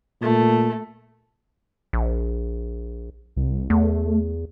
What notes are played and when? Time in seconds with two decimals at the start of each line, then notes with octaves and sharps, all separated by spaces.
0.22 A#2 A3
1.93 A#1
3.36 C2
3.70 E2 A3